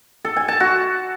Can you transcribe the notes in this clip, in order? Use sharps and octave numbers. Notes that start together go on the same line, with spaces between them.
A4
G#5
A5
F#4